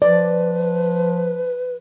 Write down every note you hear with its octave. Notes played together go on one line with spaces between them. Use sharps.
F3 B4 D5